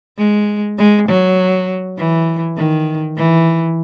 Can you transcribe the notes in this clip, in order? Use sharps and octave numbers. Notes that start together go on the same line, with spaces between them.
G#3
G#3
F#3
E3
D#3
E3